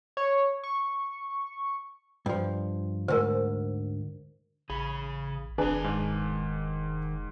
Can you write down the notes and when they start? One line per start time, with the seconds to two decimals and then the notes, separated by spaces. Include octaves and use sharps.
0.17 C#5
0.63 C#6
2.26 G2 F3
3.08 D2 G#2 A#4 C5
4.70 A1 C#3 G#4 B5
5.58 F1 D#3 D4 G#4 B4 G#5
5.84 G#2